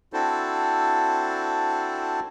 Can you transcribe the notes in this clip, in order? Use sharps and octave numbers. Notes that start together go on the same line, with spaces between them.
C4 D4 E4 F#4 A4 C5